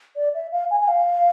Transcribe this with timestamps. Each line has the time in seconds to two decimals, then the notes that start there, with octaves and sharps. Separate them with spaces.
0.16 D5
0.34 E5
0.52 F5
0.71 G#5
0.81 G#5
0.88 F5